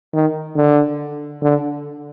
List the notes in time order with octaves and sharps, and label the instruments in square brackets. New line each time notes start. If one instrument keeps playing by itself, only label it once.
[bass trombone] D#3
D3
D3